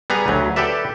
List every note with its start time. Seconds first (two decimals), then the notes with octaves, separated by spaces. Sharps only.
0.10 G3 B3 G#4 B4 G#5 A#5
0.28 D2 F#3
0.56 G4 A4 B4 D5 E5